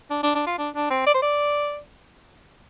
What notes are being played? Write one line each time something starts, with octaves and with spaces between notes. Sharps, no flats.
D4
D4
D4
F4
D4
D4
C4
D5
C5
D5